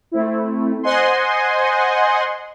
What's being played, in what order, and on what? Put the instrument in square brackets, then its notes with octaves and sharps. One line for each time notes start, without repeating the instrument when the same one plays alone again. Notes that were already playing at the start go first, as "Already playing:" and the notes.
[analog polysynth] A3 C4 E4
C5 D#5 F#5 G#5 C6